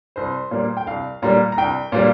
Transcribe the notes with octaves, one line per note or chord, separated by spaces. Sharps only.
C2 C5
A#2 G3 A#3
G5
C2 F5
A#2 G3 A#3 A#5
A#5
C2 G5
A#2 G3 A#3